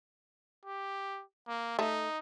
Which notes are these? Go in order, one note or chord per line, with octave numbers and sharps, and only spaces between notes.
G4
A#3
A3 D#4